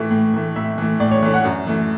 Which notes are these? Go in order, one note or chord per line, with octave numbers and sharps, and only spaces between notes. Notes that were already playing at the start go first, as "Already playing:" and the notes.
Already playing: A2 E3 A3
A2
E3 A3
A2 E5
E3 A3
A2 D5
C#5
E3 A3
F#5
F#2
E3 A3